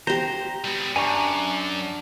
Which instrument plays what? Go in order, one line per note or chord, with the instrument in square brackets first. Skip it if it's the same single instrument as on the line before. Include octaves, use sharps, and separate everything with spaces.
[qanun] G4 C5 [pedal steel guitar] A#5
[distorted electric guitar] G3 B3
[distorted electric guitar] F#2 [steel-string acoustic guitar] D4 [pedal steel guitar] G#5 A#5 C#6